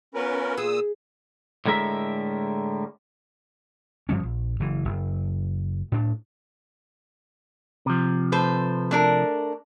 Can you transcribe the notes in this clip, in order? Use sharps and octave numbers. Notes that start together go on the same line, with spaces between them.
B3 C#4 F4 A#4 B4
A#2 G#4 D#6 E6
A2 D3 G#3 A#4 E5
G2 F3 G3 C#4
A#1
F#1 E3
F#1
A2 D4
C3 F3
A3 B4 C5
A3 D4 A#4